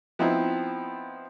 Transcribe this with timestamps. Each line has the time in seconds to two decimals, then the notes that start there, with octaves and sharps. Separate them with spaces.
0.19 F3 B3 C4 D#4 E4